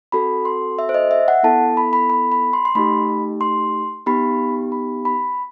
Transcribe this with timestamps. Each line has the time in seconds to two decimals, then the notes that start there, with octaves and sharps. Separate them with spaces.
0.12 C4 F#4 A4 B5
0.45 C6
0.79 E5
0.89 C5
0.94 D#5
1.11 E5
1.28 F#5
1.43 B3 E4 A4 A5
1.77 B5
1.93 B5
2.10 B5
2.32 B5
2.53 C6
2.65 C6
2.75 A3 D#4 G4 B5
3.41 C6
4.06 B3 D#4 G4 B5
4.72 B5
5.05 B5